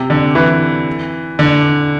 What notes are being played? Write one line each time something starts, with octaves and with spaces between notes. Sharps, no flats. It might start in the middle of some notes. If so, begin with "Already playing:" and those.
Already playing: C3
D3
E3
D3